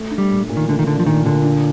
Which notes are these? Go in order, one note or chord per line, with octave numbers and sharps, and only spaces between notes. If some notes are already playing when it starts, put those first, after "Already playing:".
Already playing: A3
D4
G3
A#2
A#2
D#3
D3 A3
D#3
D3 D4
F3
A#2 D#3
A#2 D3
D4